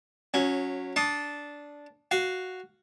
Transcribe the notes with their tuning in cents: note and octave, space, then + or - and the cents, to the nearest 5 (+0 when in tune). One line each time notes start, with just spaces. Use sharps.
F#3 -20 C#4 +0
D4 -10 C6 +25 D#6 +5
F#4 +0 F5 +0